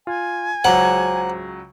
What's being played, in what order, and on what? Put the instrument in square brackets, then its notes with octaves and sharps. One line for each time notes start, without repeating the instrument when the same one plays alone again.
[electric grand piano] F4 [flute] G#5
[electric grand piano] C#2 C#3 F#3 [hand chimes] C5 A#5 D6 [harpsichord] F#5